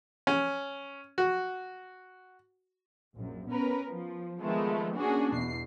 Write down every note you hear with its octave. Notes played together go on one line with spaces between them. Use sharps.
C#4
F#4
A#1 F#2
B3 C#4 A#4 B4
F3
D#3 F3 G#3 A3 B3
A#3 C#4 D4 F#4 G#4
E2 B2 C7